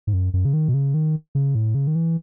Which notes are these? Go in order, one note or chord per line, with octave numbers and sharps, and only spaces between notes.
G#2
F#2
F#2
C#3
D#3
B2
C#3
D#3
C#3
A2
C#3
D#3
E3